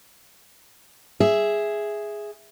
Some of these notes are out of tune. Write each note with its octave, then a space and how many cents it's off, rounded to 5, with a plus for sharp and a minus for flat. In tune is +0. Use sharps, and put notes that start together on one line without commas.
G#4 +0 E5 +0